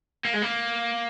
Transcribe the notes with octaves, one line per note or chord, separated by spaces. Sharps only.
A#3
G#3
A#3